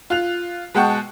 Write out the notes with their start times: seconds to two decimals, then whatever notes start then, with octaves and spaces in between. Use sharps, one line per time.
0.10 F4 F#6 F7
0.74 B2 G#3 F#5 G5 A5 C#6